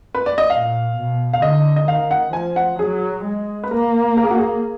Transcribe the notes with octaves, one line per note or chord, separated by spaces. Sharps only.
B4
D5
D#5
A#2 F5
B2
F5
D3 D#5
D#5
D#3 F5
F#5
F3 G#5
F#5
F#3 G#4
G#3
B4
A#3 A#4
A#4
G#4
F#4
G#4